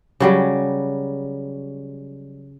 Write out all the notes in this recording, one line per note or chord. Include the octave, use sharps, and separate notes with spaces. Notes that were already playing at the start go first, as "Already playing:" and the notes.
C#3 F#3 G3